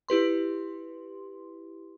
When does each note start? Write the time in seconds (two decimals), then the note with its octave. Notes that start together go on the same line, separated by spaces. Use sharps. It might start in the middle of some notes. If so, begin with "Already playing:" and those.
0.09 E4 G4 B4 C6